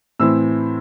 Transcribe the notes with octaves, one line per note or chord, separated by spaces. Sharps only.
A2 E3 C4 E4 E6